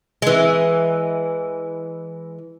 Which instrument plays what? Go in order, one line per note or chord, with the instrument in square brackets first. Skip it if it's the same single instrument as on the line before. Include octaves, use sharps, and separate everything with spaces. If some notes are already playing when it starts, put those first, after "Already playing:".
[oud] E3 G#3